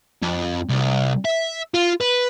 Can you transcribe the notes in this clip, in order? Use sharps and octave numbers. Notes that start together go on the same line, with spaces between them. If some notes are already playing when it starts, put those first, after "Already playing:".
F2
C2
E5
F4
B4